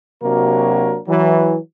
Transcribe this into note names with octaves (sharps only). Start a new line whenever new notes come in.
C3 F#3 A#3 D4 F#4 A#4
E3 F#3